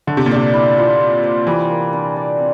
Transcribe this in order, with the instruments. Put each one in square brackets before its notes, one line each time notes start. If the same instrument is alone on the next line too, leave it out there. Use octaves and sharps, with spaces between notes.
[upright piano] D3 [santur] A3
[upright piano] C3
A#2
[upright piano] C3 [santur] D5
[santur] E4
F4
F5
C5
[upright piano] E3 [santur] G3
[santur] A#3
D4
D5
C4